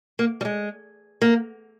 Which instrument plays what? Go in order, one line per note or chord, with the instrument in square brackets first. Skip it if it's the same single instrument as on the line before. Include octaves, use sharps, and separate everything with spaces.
[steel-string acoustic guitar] A#3
G3
G#3
A#3